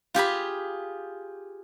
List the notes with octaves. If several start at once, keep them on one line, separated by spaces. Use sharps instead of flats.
F4 G4 G#4 B5